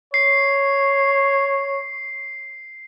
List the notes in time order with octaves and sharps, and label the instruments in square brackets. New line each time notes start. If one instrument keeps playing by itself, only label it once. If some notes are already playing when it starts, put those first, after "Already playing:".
[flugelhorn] C#5 [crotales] C7